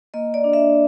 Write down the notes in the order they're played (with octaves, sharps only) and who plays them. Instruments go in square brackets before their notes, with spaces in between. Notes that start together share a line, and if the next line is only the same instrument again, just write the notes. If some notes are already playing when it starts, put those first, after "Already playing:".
[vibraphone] A#3 D#5
D5
D4
E5